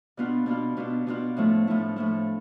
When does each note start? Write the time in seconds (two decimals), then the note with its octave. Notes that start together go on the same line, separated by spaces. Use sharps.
0.17 B2 B3 D4 F4
0.46 B2 B3 D4 F4
0.77 B2 B3 D4 F4
1.07 B2 B3 D4 F4
1.37 A2 F3 A3 E4
1.67 A2 F3 A3 E4
1.96 A2 F3 A3 E4